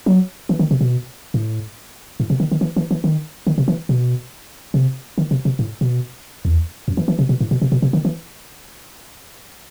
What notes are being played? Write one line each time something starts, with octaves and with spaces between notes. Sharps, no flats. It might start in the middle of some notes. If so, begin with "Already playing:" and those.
F#3
E3
D#3
C3
B2
A2
A2
C3
D#3
D#3
E3
E3
E3
D#3
D#3
C3
E3
B2
C3
D#3
C3
C3
A2
B2
E2
F#2
E3
E3
C3
B2
A2
B2
C3
B2
C3
D#3
E3